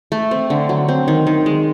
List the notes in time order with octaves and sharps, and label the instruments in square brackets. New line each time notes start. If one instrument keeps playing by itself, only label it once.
[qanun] A3
C4
D3
F#3
C4
D#3
D#3
G#3